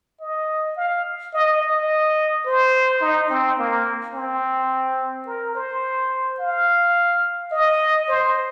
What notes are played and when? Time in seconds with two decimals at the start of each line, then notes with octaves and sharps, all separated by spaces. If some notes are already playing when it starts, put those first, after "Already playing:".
0.21 D#5
0.76 F5
1.33 D#5
1.62 D#5
2.45 C5
3.01 D#4
3.30 C4
3.59 A#3
4.14 C4
5.26 A#4
5.55 C5
6.40 F5
7.52 D#5
8.08 C5